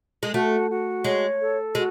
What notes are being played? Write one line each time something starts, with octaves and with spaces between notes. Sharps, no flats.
G#3
A3 F#4
F#4
G#3 C#5
A4
G#3 F#4